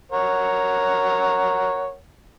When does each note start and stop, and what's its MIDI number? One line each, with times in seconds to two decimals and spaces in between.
0.12 1.95 70
0.12 1.95 73
0.12 1.95 78